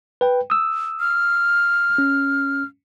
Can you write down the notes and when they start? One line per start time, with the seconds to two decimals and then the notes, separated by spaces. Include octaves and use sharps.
0.21 B4 G5
0.50 D#6 E6
1.00 F6
1.98 C#4